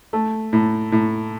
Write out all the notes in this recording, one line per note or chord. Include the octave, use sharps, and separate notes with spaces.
A3
A2
A2